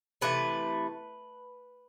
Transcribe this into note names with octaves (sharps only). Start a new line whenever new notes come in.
C3 E3 A3 B4